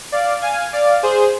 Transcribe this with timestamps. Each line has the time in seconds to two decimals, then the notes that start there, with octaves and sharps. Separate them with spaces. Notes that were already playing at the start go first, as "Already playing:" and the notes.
0.12 D5 F5
0.42 F5 G#5
0.73 D5 F5
1.03 G#4 C5